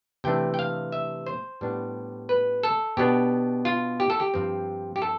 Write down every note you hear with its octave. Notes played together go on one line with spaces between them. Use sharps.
C3 E3 A3 D4 G5
G5
F5
E5
C5
A2 G3 B3 D4
B4
A4
B2 B3 D4 G4
F4
G4
A4
G4
G2 F3 C4
G4
A4